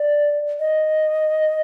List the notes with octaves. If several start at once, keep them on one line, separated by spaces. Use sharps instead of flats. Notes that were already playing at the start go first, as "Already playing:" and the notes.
Already playing: D5
D#5